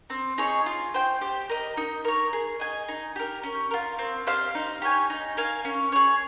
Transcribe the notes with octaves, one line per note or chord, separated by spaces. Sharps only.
C4
D#4 G#4 C#5
F4
C5 G5
G4
A#4 D#5
D#4
A#4 C#5
G#4
D#5 G#5
D#4
G4 A#4
C#4
F4 A#4
C4
G4 C5 F5
D#4
G4 C#5 G#5
D#4
A#4 F5 G#5
C#4
G#4 C#5